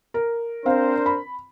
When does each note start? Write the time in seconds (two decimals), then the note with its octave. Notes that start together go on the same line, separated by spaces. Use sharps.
0.14 A#4
0.66 C4 D4 A#4 C5 F5
1.06 B5